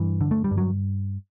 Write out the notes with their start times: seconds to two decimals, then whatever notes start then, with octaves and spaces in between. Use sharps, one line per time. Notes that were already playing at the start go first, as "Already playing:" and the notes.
Already playing: G2 E3
0.21 D3
0.31 A3
0.44 G3
0.51 G2
0.58 F#3